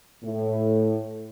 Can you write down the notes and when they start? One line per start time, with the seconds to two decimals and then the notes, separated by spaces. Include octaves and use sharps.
0.24 A2